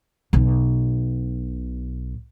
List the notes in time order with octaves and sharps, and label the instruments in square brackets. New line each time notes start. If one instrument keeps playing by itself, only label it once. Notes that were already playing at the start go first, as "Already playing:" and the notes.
[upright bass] B1 B2